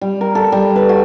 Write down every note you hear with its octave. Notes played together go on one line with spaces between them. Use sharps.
G3
A#4
A4
G3
B4
F#4